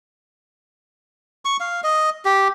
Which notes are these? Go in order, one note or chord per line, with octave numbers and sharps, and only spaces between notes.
C#6
F5
D#5
G4